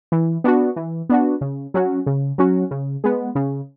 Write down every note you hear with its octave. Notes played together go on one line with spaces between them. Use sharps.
E3
B3 D4 F#4
E3
B3 D4 F#4
C#3
F#3 C#4 F#4
C#3
F#3 C#4 F#4
C#3
G#3 B3
C#3